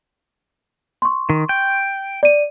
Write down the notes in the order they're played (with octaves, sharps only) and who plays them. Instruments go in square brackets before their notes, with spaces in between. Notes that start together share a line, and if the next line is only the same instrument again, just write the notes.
[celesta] C6 C#6
[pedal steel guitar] D#3
G5
[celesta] D5 D#7